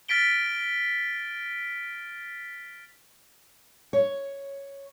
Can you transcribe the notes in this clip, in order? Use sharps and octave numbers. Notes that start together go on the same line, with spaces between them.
F6 A6 B6 D7 G7
C#5